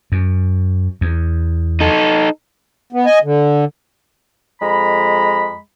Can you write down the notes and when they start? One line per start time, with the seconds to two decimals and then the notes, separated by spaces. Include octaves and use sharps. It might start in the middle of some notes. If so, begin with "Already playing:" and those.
0.12 F#2
1.01 E2
1.80 D#4 A4
2.93 B3
3.06 D#5 G#5
3.23 D3
4.61 F2 G#3 A#5 B5